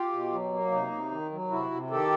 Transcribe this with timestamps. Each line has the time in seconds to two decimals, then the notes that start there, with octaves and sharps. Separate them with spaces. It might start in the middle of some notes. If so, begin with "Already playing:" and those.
Already playing: F4 G4
0.12 B2
0.32 F#3
0.52 A#3
0.72 C3 D#4
0.92 C3
1.11 D#3
1.31 F#3
1.50 C3 E4 F#4
1.71 C3
1.90 D#3 G4 A4